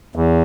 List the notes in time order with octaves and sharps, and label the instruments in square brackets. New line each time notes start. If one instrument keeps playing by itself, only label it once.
[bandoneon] E2